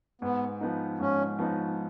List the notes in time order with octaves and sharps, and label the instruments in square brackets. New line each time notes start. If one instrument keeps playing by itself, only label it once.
[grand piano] G#2 [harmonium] B3
[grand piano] F3 B3 D#4
[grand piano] G#2 [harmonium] C#4
[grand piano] F3 B3 D#4